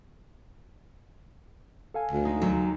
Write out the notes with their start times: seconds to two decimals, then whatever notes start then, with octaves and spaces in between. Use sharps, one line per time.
1.94 A4 F5 G#5
2.12 D2
2.25 G#3 D#4
2.41 D#2 F#3